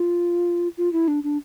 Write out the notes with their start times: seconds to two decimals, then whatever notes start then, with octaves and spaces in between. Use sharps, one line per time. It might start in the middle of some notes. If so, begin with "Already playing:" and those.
Already playing: F4
0.78 F4
0.93 E4
1.08 D4
1.24 D4